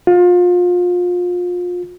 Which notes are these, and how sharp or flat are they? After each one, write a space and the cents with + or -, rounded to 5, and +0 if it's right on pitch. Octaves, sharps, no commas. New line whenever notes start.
F4 +30